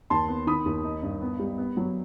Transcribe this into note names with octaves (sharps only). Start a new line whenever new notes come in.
D#2 A5 C6
B3
D#3 B5 D#6
D#2
D#4
G2
B3
G3
B3
F#3